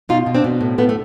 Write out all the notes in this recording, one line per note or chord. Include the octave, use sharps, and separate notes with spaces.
B2 D#4 F4
B2
C4 D4
B2
A2
A2 A3 B3
A3